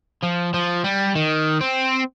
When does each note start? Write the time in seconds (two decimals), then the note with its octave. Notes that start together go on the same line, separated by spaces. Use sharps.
0.23 F3
0.54 F3
0.84 G3
1.15 D#3
1.61 C4